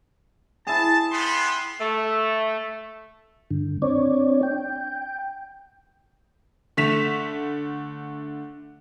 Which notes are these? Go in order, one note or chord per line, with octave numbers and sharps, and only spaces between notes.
E4 G#4 A5
G3 B3 C6
A3
G2 D3
C4 D4 C#5 D5
G5
D3 A3 B6 E7 F7